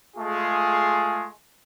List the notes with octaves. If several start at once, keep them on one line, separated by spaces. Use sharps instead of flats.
G#3 A3 F4 G#4